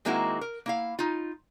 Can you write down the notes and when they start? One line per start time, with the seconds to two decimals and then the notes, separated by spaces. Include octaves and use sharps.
0.05 D#3 G#3 A#3 C4 E4 F#4
0.41 A#4
0.66 A#3 E4 F5
0.99 D#4 F4